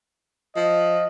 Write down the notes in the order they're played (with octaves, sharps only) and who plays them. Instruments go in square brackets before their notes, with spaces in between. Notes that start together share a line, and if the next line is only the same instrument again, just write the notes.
[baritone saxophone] F3 [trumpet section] D#5